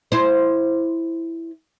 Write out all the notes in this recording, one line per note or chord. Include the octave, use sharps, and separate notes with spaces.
E4 C5